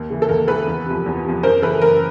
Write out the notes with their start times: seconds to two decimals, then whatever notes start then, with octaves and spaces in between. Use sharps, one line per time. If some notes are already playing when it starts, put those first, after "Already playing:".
Already playing: D#2
0.10 C#3 E3
0.22 A4
0.29 D#2 A#4
0.47 C#3 E3 A4 B4
0.67 E2
0.86 C3 F3
1.06 E2
1.25 C3 F3
1.43 F#2 A#4 C5
1.62 C#3 E3 A4 B4
1.82 F#2 A#4